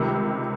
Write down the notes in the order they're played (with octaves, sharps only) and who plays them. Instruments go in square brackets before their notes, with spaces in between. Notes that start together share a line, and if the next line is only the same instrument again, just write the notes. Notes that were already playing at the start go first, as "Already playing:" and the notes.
Already playing: [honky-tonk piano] C#2 C3 D#3 G3